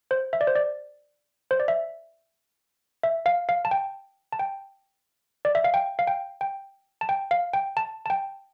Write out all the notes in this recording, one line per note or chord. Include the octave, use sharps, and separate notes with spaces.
C5
E5
D5
C5
D5
C5
D5
E5
E5
F5
F5
A5
G5
A5
G5
D5
E5
F5
G5
F5
G5
G5
A5
G5
F5
G5
A5
A5
G5